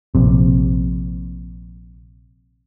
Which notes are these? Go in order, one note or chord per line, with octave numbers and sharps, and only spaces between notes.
A#1 C3